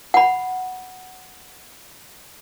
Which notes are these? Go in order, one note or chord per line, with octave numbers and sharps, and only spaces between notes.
F#5 B5